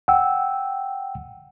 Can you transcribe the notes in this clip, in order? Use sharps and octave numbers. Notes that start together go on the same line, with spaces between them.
F#5 G5 E6